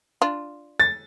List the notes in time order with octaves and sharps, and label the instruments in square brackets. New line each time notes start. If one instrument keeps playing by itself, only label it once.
[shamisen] D4 F4
[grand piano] A6